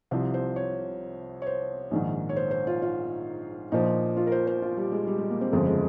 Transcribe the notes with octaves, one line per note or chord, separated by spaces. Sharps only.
C2 C3 F3 C5
C5
C#5
C#5
C5
A#1 G#2 D#3
C#5
C5
C5
F4
F4
A#1 A#2 F3 D#4
F4
A#4
C5
C5
F4
G3
G#3
G3
G#3
A#3
C4
G1 F2 C#3 F3 G#3
G#3